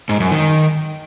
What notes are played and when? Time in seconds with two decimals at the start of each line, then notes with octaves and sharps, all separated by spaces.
0.09 G#2
0.20 F#2
0.31 D#3